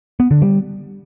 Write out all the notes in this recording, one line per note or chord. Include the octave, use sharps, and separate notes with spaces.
B3
D3
G3